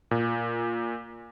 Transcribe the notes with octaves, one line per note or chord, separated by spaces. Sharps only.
A#2